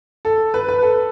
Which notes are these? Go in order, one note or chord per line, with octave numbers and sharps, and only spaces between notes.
A4
B4
B4
A4